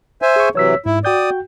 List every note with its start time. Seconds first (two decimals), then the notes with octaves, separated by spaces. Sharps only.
0.22 C5 E5 G#5
0.36 G#4 C#6
0.55 C3 E3 F#3 C#5 E6 B6
0.86 G#2 E4
1.05 F#4 D5 G5 D#6 G6